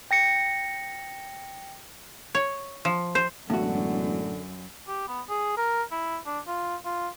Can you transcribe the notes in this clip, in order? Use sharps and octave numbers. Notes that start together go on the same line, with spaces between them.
G5 A#6 C#7
C#5
F3
C5
E1 F#2 A2 D3 F#4
G4
B3
G#4
A#4
E4
D4
F4
F4